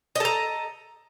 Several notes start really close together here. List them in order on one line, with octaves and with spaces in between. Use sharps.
D#5 A4 A#5